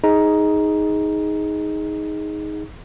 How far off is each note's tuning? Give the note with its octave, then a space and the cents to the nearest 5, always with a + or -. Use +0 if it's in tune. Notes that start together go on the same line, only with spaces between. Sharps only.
D#4 +10 G#4 +0